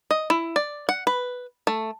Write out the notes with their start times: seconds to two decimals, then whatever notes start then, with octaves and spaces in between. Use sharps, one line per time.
0.11 D#5
0.30 E4
0.56 D5
0.89 F#5
1.07 B4
1.67 A3